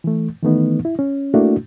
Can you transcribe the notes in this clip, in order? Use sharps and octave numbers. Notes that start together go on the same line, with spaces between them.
E3 A3
D#3 E3 A3 B3 D#4
E4
C#4
A3 A#3 D4 E4 F#4